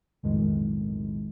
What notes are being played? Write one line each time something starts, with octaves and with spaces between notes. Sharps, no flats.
B1 F2 A2 D#3 G#3